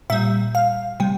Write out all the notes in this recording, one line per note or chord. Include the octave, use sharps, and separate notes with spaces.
A#2 G3 E5
F5
C3 G3 G5